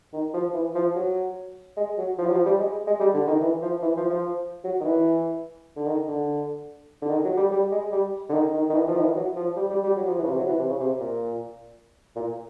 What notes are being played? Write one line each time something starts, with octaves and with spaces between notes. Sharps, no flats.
D#3
F3
E3
F3
F#3
G#3
F#3
F3
F#3
F3
G3
G#3
G#3
G3
D3
D#3
E3
F3
E3
F3
F3
F#3
D#3
E3
D3
D#3
D3
D3
D#3
F#3
G3
G3
G#3
G3
D3
D#3
D#3
D#3
E3
F3
D#3
E3
F#3
F3
G3
G3
G3
F#3
F3
E3
C#3
C3
F#3
E3
C3
C#3
C3
A#2
A#2